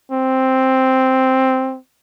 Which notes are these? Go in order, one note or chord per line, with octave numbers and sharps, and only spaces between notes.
C4